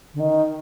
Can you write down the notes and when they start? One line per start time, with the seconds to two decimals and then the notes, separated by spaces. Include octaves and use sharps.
0.14 D3
0.20 D#3